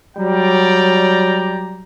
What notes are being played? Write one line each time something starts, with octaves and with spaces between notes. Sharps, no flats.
F#3 G3 D5 G5 A#5